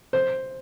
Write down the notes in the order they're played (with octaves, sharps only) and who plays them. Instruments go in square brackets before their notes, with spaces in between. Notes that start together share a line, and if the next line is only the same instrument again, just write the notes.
[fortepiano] C5